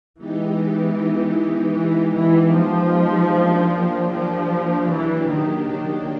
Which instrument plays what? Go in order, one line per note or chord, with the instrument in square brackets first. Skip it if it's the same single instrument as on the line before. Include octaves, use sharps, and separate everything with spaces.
[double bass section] E3 [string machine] G#3 B3 D#4 G4
[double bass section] E3
E3
F3
[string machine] F#3 A#3 D4 G4
[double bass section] F3
E3
D#3
D#3